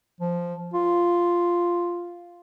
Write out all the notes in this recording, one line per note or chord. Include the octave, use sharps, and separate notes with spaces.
F3
F4